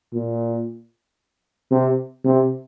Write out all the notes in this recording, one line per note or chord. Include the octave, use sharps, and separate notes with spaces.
A#2
C3
C3